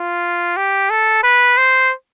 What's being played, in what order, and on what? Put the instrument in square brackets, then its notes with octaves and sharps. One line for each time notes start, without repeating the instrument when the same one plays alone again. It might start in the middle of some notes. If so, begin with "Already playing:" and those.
Already playing: [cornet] F4
G4
A4
B4
C5